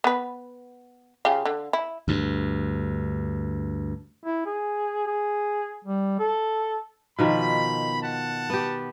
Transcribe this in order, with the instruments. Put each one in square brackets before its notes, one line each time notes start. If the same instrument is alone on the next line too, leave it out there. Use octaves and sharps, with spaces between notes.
[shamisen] B3 B4
C#3 F4 G4
D3
E4
[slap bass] D2 G2
[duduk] E4
G#4
G#4
G3
A4
[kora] B2 D#3 F3 [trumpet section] B5
[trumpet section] F#5 A5
[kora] B3 G4